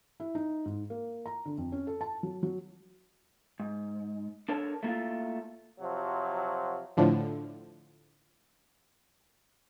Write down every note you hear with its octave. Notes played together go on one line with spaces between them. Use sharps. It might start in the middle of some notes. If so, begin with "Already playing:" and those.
E4
D#4
G#2
A#3
A#5
D3
F2
C#4
A4
A5
F#3
F#3
G#2
D4 A4 A#4 C#5 A5
A3 A#3 E4 F4
C3 F3 F#3
A2 D3 F3